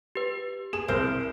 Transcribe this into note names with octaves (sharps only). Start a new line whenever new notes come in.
G4 B4
G#4 E7
C2 A#4 C5